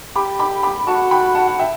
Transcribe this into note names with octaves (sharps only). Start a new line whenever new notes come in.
G4 B5 D6
B5 D6
B5 D6
F#4 A5 C#6
G5 B5
F#5 A5
F#5
E5 G5